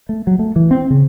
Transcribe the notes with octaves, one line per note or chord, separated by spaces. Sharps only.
A3
F#3
A3
E3
C4
C#3